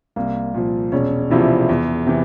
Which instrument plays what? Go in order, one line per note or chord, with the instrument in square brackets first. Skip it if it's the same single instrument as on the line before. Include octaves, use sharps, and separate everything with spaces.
[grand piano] C2 A#3
A#2 F3
E1 C#4
E2 C3 F3 E4
E2
C3 E3